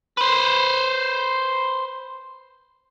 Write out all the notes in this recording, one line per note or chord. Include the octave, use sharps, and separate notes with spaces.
B4 C5